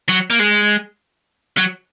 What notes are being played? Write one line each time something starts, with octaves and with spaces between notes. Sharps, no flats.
F#3
A#3
G#3
F#3